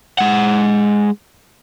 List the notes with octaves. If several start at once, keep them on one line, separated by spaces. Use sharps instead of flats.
G#3 F#5